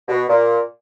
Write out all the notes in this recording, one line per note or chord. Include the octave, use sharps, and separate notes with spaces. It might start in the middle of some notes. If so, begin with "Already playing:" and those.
B2
A#2